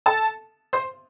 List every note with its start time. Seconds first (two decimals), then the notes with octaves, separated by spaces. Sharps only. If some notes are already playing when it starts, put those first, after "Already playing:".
0.06 A4 A5
0.73 C5 C6